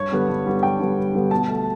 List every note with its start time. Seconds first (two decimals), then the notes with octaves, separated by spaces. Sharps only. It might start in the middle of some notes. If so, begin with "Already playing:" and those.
Already playing: G2 C#5
0.12 D3 G3 B3
0.29 G2
0.46 D3 G3 B3
0.63 G2 G5
0.80 D3 G3 B3
0.97 G2
1.14 D3 G3 B3
1.31 B2 A5
1.49 A3